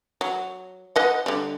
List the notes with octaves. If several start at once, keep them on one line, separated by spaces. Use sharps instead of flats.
F#3
B4 D#5 F#5
D3 G3